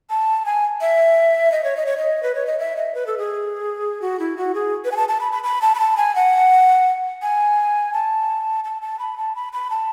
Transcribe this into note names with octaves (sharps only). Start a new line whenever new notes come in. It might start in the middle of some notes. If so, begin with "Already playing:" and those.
A5
G#5
E5
D#5
C#5
D#5
C#5
D#5
B4
C#5
D#5
E5
D#5
B4
A4
G#4
F#4
E4
F#4
G#4
B4
G#5
A5
A5
B5
B5
B5
A5
B5
A5
G#5
F#5
G#5
A5
A5
A5
B5
A5
B5
B5
A5